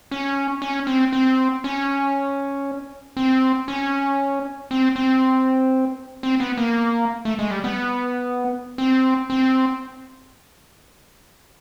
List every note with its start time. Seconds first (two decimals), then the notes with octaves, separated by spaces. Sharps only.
0.11 C#4
0.62 C#4
0.87 C4
1.13 C4
1.64 C#4
3.17 C4
3.68 C#4
4.71 C4
4.96 C4
6.23 C4
6.40 B3
6.58 A#3
7.25 A3
7.39 G#3
7.50 G3
7.64 B3
8.78 C4
9.30 C4